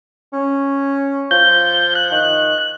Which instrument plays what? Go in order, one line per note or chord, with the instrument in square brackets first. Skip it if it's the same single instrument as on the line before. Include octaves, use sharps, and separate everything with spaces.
[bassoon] C#4
[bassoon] F3 [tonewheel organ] G6
[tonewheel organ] F#6
[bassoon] D#3